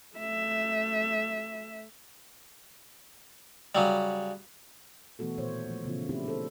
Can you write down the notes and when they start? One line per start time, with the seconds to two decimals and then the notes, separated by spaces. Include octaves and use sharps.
0.16 A3 E5
3.75 C#3 F#3 G3
5.19 B2 E3 A3 B3 F#4 A4
5.38 A#2 D#3 C5 C#5
5.67 F3 A3
5.84 A#2 C#3 E3 B3 F4
6.09 A3 C4 D4 E4 G4
6.26 D4 A4 C5